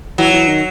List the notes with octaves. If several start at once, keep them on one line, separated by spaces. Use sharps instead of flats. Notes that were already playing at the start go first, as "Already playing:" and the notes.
E3 F#3
E3
D#3